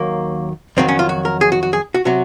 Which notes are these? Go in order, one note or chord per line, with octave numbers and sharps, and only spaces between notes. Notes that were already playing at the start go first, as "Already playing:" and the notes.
Already playing: D#2 D#3 F#3 A#3
F2 D#3 F#3 C4
C#4
F4
F#4
A#4
G#4
F#4
F#4
G#4
F#4
C3 F#3 F#4